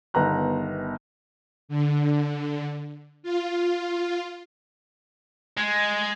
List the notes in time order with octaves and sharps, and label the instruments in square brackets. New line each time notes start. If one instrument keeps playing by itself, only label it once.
[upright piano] G1 D#3 B3 A#5 F#6
[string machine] D3
F4
[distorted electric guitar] G#3